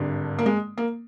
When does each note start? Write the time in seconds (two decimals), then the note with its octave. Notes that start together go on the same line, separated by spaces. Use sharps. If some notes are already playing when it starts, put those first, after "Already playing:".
Already playing: G#1 G2 D3
0.38 A#3
0.46 G#3
0.78 A#3